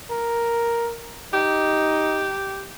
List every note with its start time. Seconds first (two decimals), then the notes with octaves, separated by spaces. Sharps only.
0.11 A#4
1.33 D#4 G4